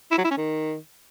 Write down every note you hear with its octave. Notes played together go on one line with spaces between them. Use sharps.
E4
F#3
E4
C#4
D#3